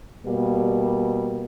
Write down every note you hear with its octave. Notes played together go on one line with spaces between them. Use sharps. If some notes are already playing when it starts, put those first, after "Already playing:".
B2 G3 A#3